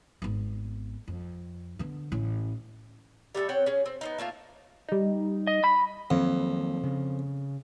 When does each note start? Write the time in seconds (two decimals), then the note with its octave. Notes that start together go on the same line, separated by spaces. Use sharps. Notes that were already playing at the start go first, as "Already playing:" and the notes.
0.22 G#1 B3
1.08 F2
1.79 D3 B3
2.12 A1 C#4
3.35 G3 A3 G4 A4
3.49 C4 C#5 F#5 G5
3.66 C#4 G#4
3.86 C4
4.01 B3 C4 D#4
4.18 A3 A#3 E4 F4
4.88 G3 D#4
5.47 D#5
5.64 B5
6.11 F2 D#3 F#3 A#3
6.83 C#3